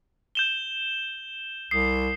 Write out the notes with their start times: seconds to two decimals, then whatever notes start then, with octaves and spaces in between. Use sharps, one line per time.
0.35 G6 E7 G7
1.71 C2 D#6 C7